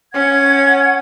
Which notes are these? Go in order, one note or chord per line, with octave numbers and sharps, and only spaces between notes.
C#4 F#5 G#6